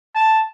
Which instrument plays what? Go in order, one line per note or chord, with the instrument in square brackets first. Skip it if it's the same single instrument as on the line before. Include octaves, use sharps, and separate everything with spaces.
[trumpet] A5